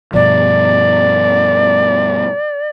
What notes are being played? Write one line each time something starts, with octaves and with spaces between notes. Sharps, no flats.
G2 B2 F3 D5